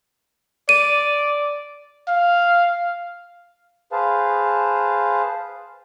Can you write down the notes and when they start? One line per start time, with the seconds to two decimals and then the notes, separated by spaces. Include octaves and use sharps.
0.69 D5 D#7
2.08 F5
3.92 G#4 B4 C5 F5 A5